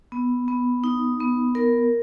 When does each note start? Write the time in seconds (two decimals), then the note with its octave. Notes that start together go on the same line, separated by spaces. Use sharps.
0.12 B3
0.48 B3
0.84 D#4
1.20 B3
1.55 A#4